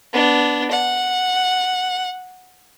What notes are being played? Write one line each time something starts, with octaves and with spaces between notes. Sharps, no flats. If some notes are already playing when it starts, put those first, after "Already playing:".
B3 D4
F#5